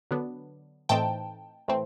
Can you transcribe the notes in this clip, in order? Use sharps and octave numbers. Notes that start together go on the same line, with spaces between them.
D3 F#3 B3 D4
A2 E3 A3 C4 D#4 G5 A5
A2 E3 A3 C4